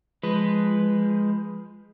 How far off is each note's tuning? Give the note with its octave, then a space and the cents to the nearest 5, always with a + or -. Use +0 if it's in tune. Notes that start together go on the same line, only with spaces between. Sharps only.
F3 +0 G#3 +0 B4 +0